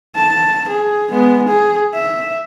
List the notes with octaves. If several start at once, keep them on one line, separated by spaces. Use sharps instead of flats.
A5
G#4
G#3 B3
G#4
E5